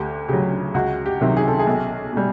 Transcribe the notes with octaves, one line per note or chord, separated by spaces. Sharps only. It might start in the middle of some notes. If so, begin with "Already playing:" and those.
Already playing: D2 G4
C#3 F#3 G4
C#2 F#4
G4
C3 D#3 F#3
G#4
A4
G#4
B1
B2 G3